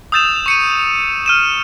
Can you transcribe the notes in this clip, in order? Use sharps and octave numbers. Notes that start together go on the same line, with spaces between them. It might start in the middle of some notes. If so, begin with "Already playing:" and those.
D#6 E6 G6 A6 E7 F7
C#6 C#7 D#7
F6 D#7 E7